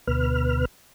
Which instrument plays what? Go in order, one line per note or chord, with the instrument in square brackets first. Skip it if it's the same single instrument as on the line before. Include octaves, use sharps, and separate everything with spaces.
[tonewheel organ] D2 B2 B4 F6